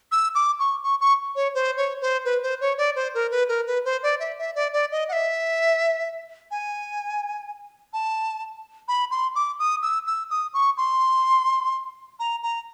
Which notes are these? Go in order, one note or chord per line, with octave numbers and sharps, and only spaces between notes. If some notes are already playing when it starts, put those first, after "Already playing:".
E6
D6
C#6
C#6
C#6
C#5
C5
C#5
C5
B4
C5
C#5
D5
C5
A#4
B4
A#4
B4
C5
D5
E5
E5
D5
D5
D#5
F#5
E5
G#5
A5
B5
C6
D6
D#6
E6
E6
D#6
C#6
C6
A#5
A#5